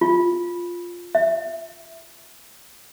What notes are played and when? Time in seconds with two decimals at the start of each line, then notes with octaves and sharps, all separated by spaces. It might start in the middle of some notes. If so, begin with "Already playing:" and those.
0.01 F4
1.15 E5